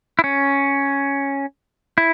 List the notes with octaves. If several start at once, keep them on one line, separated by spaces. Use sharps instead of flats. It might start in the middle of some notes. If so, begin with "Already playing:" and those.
E4
C#4
E4